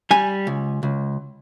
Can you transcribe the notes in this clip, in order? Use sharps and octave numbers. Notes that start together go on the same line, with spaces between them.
G3 G#5
C#2
C#2